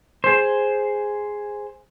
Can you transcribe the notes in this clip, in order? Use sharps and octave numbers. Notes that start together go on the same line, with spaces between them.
G#4 C5